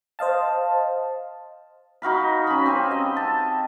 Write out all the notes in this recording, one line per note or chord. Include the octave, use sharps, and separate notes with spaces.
C5 D#5 F5 A5
D#4 F#4 F5 B5
C#4 B5
C4 G4 G#5
D#5
A5